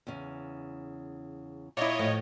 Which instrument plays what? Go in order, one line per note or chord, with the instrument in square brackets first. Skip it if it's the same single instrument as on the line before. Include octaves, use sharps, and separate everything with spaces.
[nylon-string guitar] E2 C#3
[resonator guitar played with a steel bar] A#2 E4 [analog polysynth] C#5 D#5
[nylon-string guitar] A2 F3